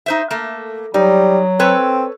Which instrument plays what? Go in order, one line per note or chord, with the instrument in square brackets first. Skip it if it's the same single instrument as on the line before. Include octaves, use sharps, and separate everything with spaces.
[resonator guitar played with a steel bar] D#4 C5 E5
A3 A#3
[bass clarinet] F#3 [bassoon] G3 [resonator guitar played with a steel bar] D#4
[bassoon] C4 [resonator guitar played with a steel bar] A4 B4 C#5